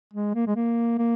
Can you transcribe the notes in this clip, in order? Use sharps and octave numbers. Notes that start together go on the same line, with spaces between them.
G#3
A#3
G#3
A#3
A#3